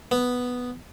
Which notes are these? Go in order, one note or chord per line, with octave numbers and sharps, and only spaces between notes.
B3